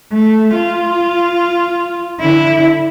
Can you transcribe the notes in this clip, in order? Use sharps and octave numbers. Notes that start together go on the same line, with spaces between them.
A3
F4
D3 E4